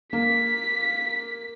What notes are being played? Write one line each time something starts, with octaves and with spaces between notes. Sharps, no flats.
A#3 B6